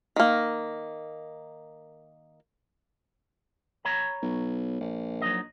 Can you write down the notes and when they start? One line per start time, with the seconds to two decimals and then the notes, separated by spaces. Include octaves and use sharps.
0.16 D#3 A#3
3.85 C#5 A#5 B5
4.23 B1
4.81 A#1
5.21 F#3 D#4 D#5